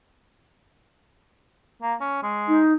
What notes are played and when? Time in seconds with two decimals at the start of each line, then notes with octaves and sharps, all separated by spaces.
1.82 A#3
2.00 C#4
2.23 G#3
2.48 D#4